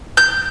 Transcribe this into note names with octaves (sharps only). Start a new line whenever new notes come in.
G6